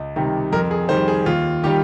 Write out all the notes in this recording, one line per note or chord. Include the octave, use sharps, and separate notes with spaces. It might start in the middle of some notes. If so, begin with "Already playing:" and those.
Already playing: C#2
C3 D#3 G3
F2 A#4
G#4
D#3 G3 C5
G#4
D#2 F4
D#3 G3 G4